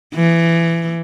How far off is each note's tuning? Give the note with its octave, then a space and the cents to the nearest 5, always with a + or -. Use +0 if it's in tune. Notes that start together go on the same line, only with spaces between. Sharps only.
E3 +20